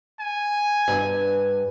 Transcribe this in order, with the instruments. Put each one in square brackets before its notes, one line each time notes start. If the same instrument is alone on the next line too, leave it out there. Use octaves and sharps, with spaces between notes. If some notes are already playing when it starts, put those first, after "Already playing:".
[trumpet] G#5
[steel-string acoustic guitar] G2